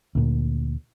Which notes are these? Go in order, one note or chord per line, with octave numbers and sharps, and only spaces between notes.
D2 A#2